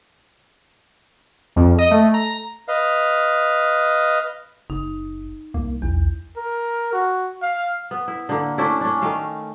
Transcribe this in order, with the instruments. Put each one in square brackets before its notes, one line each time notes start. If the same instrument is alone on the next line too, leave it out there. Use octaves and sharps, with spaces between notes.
[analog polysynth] F2
D#5
A3
A#5
[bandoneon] B4 D#5 F5
[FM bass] F#1 [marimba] D#4
[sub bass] C2 [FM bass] A#3
[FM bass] A#1 [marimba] E2
[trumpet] A#4
F#4
F5
[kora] B3
E4
D3 A#3
A3 C#4 D4 E4
C#4 D4
D#3 A3 F5